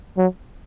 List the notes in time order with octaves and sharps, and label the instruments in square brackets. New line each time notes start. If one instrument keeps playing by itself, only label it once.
[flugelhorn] F#3